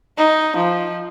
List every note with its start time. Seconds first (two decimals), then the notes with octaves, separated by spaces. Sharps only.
0.18 D#4
0.56 F3